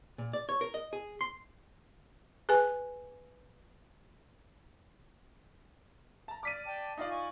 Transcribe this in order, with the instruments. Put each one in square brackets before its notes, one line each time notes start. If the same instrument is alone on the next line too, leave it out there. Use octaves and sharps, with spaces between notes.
[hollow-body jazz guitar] A#2
D5
C#5
A#4
D#5
G#4
C6
[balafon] G#4 B4 G#5
[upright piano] A5 A#5
[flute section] D5 F6 [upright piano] D6 B6 D#7
[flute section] D5 G5 A5
[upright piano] D#4 F4 D5 [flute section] D#5 F5
[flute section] G#5 C#6